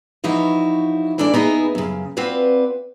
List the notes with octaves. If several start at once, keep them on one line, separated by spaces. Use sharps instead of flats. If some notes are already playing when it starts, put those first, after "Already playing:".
E3 F3 D#4 E4 F#4 C#5
G#2 E3 D4 A4 D5
B3 D#4 E4 G#4
F#2 C#3
C4 F4 F#4 B4 D5